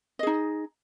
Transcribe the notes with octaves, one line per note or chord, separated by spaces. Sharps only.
D#4 G#4 D#5